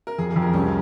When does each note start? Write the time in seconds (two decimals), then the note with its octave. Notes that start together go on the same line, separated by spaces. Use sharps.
0.07 A#4
0.18 F2 G#4
0.30 G#4
0.36 F2
0.42 A#4
0.53 C2 C#4